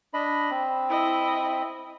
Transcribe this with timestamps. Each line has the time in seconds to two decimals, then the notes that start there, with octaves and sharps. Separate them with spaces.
0.14 D4 D#5 B5
0.51 C4
0.90 E4 D#5